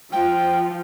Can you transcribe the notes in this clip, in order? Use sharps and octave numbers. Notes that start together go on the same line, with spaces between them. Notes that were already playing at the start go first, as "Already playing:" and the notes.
F3 G5